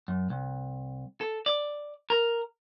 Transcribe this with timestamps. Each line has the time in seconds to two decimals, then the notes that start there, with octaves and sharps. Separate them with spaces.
0.08 F#2
0.30 C2
1.21 A4
1.46 D5
2.10 A#4